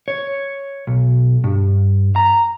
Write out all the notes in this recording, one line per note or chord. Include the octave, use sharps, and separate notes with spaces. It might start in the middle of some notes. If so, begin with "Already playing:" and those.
C#5
B1
G2
A#5